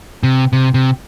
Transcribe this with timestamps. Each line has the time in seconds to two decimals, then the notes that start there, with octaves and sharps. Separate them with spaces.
0.23 C3
0.53 C3
0.74 C3